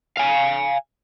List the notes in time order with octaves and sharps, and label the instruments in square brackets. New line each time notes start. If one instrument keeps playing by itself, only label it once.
[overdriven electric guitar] F5 G#5